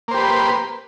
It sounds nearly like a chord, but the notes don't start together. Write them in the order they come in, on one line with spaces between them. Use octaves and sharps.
A#3 C5 G4 B4